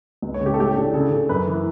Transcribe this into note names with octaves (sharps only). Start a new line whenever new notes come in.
C#2
C#5
C#3
G4
A4
A2 G4
A4
D4 G4
C#3 A4
C#3
F#2 B4
E3